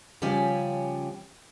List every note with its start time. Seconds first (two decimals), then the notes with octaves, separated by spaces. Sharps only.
0.22 C#3 F3 G3 C#4 G4 G#5